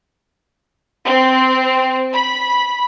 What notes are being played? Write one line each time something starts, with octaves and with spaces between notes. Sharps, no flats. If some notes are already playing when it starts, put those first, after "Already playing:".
C4
B5